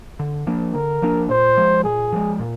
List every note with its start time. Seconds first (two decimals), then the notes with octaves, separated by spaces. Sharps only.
0.19 D3
0.47 F3 A#3 D4
0.74 D3 A#4
1.02 F3 A#3 D4
1.29 A#2 C5
1.57 F3 G#3
1.84 A#2 G#4
2.12 F3 G#3
2.40 A#2